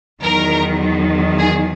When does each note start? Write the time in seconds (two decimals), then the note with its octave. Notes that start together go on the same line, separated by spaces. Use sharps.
0.21 E2 D#3 F#3 A#4
1.38 G#4